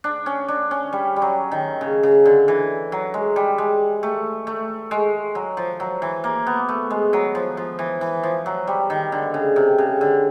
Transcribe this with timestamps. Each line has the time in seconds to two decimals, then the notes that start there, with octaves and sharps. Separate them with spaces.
0.04 D4
0.26 C#4
0.48 D4
0.71 C#4
0.93 G3
1.16 G3
1.22 F#3
1.52 D#3
1.81 C#3
2.03 C#3
2.25 D3
2.48 E3
2.92 F#3
3.14 G#3
3.36 G3
3.58 G#3
4.03 A3
4.47 A3
4.91 G#3
5.35 F#3
5.57 F3
5.80 F#3
6.02 E3
6.24 A#3
6.47 B3
6.69 A3
6.91 G#3
7.13 F#3
7.35 F3
7.57 F3
7.79 E3
8.01 E3
8.23 F3
8.46 F#3
8.67 G3
8.90 D#3
9.12 D3
9.34 C#3
9.56 C3
9.78 C#3
10.01 D3